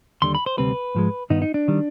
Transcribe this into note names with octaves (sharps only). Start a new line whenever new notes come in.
D#2 D3 G3 C6
B5
C5
D2 C3 G3 C4 B4
G#2 F3 G#3
G2 D#3 B3 D#4
D#4
D4
D#3 G3